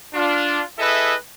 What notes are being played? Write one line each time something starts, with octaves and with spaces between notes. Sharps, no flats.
D4 F4
E4 G#4 A4 B4 D#5 E5